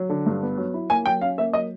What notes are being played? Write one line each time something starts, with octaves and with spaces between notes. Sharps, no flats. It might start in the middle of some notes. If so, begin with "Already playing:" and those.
Already playing: F#3
D3
G2
B3
F#3
E4
A#3 G#5
F#3 G5
C#4 F5
A#3 E5
F#3 D#5